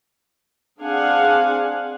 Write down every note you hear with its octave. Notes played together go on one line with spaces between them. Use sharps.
C4 D4 G#4 F5 F#5 G#5